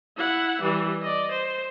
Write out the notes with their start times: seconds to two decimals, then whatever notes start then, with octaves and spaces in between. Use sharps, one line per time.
0.17 E4 F#5
0.61 E3 G3
1.02 D5 D#5
1.31 C5